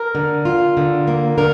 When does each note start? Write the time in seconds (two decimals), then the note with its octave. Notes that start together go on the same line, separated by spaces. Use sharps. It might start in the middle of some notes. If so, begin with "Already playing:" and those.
Already playing: A#4
0.15 D3
0.45 F4
0.77 D3
1.08 A#3
1.38 D3 A#4